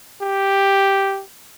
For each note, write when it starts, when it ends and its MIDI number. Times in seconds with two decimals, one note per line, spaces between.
0.21 1.22 67